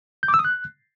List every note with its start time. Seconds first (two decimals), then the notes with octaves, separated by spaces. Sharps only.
0.23 G6
0.28 D6
0.34 E6
0.39 D#6
0.45 F#6